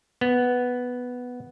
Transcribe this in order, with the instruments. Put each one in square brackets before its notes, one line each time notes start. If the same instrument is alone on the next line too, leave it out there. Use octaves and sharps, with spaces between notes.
[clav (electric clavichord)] B3